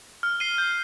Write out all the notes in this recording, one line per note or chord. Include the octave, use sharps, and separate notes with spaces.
F6
C7 D#7 G7
G6